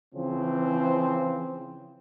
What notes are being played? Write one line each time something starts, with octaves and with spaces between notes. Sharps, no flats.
C#3 E3 F3 C4